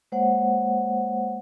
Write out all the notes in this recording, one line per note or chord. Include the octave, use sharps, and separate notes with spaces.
G#3 A#3 C5 C#5 F#5